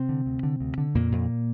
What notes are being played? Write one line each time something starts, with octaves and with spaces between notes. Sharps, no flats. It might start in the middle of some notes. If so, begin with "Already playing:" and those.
Already playing: C3 C4
D3
D2
D3
D2
D3
F2 A#2 A#3
F2